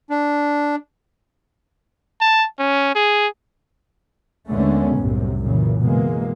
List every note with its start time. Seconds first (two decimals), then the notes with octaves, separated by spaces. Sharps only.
0.10 D4
2.21 A5
2.59 C#4
2.95 G#4
4.49 D#2 D3 G#3 A3 B3 C#4
4.97 C2 F#2 A2 C3
5.44 F#2 A#2 C#3 E3
5.80 B2 E3 G#3 A#3